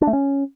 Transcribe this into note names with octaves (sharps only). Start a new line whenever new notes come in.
D4
A3
C#4